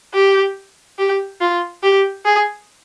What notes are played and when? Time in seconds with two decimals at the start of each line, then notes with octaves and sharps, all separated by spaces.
0.14 G4
0.99 G4
1.41 F4
1.83 G4
2.25 G#4